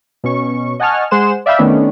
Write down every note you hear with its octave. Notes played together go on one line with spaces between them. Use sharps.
B2 C#4 C#6
D#5 F#5 G#5 A5 C#6 F6
G#3 G#4 C5 F#5 C6 E7
D5 E5 F5 G5 B5 E6
D#3 A3 B3 C#4 D4